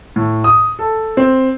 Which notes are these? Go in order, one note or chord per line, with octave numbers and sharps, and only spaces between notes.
A2
D#6
A4
C4